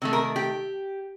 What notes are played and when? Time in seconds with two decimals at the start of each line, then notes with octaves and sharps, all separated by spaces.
0.02 C3 D#3 A3
0.13 A#4
0.36 G4